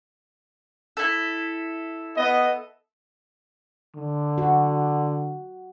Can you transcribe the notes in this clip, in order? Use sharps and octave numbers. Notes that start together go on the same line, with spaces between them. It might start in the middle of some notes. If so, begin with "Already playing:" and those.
E4 A4
B3 D#5
D3
F#4